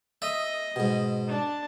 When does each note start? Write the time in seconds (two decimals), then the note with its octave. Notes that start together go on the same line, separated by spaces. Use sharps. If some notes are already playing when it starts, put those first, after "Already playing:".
0.22 D#5 E5
0.76 G#2 B2
1.28 D4 A5